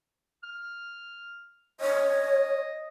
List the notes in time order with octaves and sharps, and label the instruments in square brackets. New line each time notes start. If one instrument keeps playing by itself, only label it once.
[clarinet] F6
[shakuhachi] C#5 [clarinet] D#5